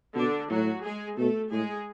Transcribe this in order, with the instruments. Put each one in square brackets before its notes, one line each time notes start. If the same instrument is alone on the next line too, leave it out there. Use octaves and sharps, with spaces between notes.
[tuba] B2 [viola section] D3 D4
[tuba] A2 [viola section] F#3 F#4
[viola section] G#3 G#4
[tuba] B2 [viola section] A3 A4
[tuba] A2 [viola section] G#3 G#4